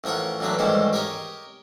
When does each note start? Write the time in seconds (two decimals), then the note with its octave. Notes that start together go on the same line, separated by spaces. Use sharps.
0.04 A1 F3 A#4 C#5 F#5
0.40 A1 F#3 A#3 D4 B4
0.59 A1 D#2 G#2 G3 C#4 C5
0.93 G4 A#4 C#5 D#5